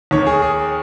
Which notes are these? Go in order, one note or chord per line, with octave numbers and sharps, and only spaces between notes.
D#2 D#3 C#5
G#4
G#4